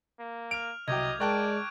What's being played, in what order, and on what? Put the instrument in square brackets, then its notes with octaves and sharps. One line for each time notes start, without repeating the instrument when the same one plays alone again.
[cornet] A#3
[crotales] F6 F7 [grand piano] D7
[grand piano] C2 F#3 G5 [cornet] D#5 [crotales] D6 G6 G#6
[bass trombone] G#3 [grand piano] A#4 G5 A5 [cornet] D5 [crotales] C#6 F#6 D7